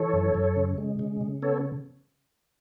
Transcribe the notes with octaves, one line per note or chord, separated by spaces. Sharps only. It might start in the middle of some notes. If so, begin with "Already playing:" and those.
Already playing: E3 A4 C#5
F#2
F#2
C#3
G#3
C#3
C#3
B3 A4 C#5